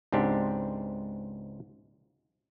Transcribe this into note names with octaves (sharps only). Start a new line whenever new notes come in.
C#2 G#2 C4 D4 G4